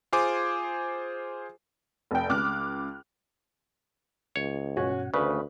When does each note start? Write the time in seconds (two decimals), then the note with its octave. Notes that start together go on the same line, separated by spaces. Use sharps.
0.13 F4 G#4 C5 G#5 D6
2.11 F1 G5
2.29 C#2 D6 F6 F#6
4.36 C#2 C#5
4.77 G2 B2 C#4 F#4 F#5
5.14 D2 C#3 A3 B4 C5 D5